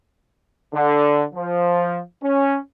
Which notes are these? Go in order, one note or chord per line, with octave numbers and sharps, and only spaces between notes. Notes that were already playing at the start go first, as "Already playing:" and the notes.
D3
F3
C#4